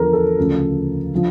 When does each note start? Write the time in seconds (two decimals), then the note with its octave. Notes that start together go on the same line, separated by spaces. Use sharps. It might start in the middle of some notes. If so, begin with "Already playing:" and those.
Already playing: E2 D3 F3 A4 A#4
0.13 A4
0.38 D2 C#3 F3
1.14 D3 F3